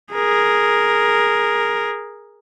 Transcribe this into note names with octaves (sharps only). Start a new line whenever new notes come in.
G#4 A#4